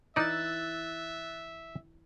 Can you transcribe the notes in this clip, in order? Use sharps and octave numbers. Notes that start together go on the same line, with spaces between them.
E3 D#4 D5 E5 E6 F#6 A6